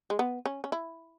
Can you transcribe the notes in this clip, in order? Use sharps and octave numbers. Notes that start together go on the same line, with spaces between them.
G#3
B3
C#4
C#4
E4